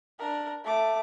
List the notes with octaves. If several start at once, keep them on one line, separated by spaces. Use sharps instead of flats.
D4 A#4
A3 D6